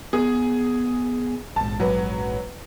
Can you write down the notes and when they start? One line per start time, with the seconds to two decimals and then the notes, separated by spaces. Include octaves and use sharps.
0.13 B3 G#4
1.56 A#1 G#2 A5
1.80 F#3 B4